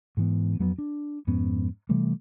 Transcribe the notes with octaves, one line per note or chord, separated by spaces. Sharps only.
G#2 E3 B3
F2 F#3 A3 B3
D4
F2 G#2 B3 C#4
C3 E3 G3 A3